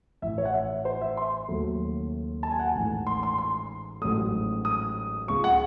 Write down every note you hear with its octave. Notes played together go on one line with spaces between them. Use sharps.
A1 A2 E3 E5
C#5
F#5
E5
C5
E5
C6
D#2 C#3 F#3 A3
A5
G#5
F#5
G#5
A1 G#2 E3 A3
C6
C6
C6
A1 G#2 F#3 A3 D#6
D#6
C#2 C#3 G#3 C#6
F#5